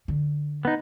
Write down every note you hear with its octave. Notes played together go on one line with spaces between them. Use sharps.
D3
B3 D#4